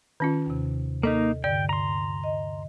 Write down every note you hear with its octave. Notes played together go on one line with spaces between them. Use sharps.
D#3 C#4 F4
D#2 C3
A#3 D#4 A4 D#5
G2 D3 D5 G5
A#5 C6
D#5